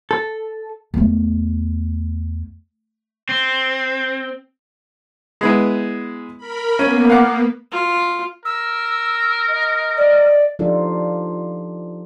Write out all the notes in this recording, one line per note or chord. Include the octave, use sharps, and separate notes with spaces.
A4
E2 A3
C4
G#3 B3 E4
A#4 B5
A#3 B3 C#4
F5 F#5 D6
F4
A#4 E6
D#5
D5
F3 D4 D#4 F4 G4 A4